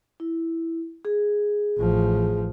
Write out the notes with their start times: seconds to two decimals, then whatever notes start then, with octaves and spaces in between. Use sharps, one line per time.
0.20 E4
1.05 G#4
1.77 A1 F3